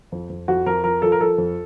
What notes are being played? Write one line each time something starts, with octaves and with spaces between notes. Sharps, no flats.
F2
F2
F2 F#4
F2 A#4
F3 A#4
F3 A4
A#4
F3 A4
F2